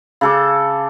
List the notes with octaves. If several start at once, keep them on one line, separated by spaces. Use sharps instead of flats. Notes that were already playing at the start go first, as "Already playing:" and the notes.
C#3 A4 D6